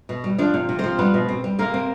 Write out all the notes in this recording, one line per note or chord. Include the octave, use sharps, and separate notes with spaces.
B2
G3
F3 D4 D5
C3
C3
F3 C4 C5
G3 B3 B4
B2
C4
G3
C3 A#3 A#4
C4